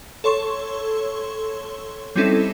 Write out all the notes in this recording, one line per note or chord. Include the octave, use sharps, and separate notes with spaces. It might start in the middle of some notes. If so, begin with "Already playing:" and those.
A4 C#5 C6 C#6
G3 C4 C#4 D#4 E4 A4